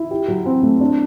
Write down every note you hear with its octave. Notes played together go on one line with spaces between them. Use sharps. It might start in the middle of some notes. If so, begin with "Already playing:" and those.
Already playing: E4
G4
F#3
C4
A3
D4